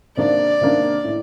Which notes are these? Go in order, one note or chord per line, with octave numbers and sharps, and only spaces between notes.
C3 D#3 A#3 D4 D5
C3 D#3 A#3 D4
A2